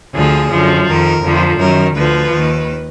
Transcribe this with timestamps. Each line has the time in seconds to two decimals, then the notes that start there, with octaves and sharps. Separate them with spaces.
0.14 D2 D3 F3 G#4
0.51 F#2 D3 F3
0.87 F2 D#3 A#4
1.23 F2 D3 F3
1.59 F#2 D#3 A#4
1.96 D2 D3 F3 B4
2.32 D#2 D#3